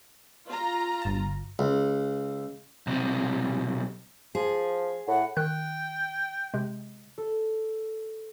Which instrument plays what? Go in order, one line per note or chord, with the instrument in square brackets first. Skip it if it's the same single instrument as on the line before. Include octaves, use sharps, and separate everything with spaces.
[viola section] F4 A#5
[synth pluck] G1 A5
[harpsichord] C#2
[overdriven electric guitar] B1 C3
[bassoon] F3 [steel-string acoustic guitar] G#4
[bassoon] A2 [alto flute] F#5
[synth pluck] D#3 F#6 [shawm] G5
[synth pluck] C3 G#3
[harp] A4